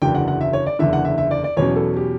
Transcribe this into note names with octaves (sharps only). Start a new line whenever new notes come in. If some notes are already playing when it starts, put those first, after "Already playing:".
F#1 E2 D3 F#3 G5
F#5
F#5
E5
C#5
D5
F#1 E2 D3 E5
F#5
E5
E5
D5
D5
E2 B2 F#3 C#4 C#5
A4
G4